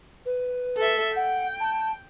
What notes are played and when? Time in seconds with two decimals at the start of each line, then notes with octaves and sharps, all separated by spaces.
0.25 B4
0.77 A4 E5
1.15 F#5 G5
1.60 A5